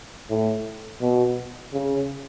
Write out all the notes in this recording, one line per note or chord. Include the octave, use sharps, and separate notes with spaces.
A2
B2
C#3